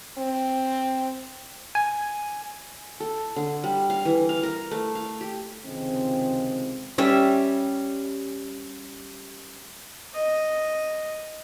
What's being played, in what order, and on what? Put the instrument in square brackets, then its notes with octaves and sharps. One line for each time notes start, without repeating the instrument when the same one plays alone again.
[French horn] C4
[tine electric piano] G#5
[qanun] A4
D3
G3
F5
E3
F5
A#4
A3
F5
G4
[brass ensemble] C#2 C3 D#3 F3 G#3 C4
[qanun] G3 C#4 E5
[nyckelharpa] D#5